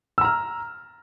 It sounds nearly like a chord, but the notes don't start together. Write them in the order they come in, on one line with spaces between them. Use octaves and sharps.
E6 A#5 F6